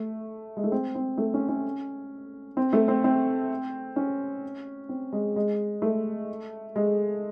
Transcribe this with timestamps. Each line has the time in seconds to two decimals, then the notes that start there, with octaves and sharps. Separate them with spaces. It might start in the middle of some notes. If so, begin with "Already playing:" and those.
Already playing: A3
0.57 G#3
0.64 A3
0.72 C4
0.95 C4
1.18 A3
1.34 C#4
1.49 C#4
2.57 C4
2.73 A3
2.88 C4
3.04 C4
3.96 C#4
4.89 C4
5.12 G#3
5.36 G#3
5.82 A3
6.76 G#3